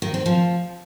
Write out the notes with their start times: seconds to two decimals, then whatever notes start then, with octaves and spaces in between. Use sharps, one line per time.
0.02 D#3
0.14 C4
0.26 F3